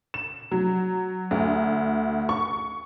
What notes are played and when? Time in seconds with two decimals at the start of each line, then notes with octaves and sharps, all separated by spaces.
0.14 E7
0.51 F#3
1.31 D2
2.29 C#6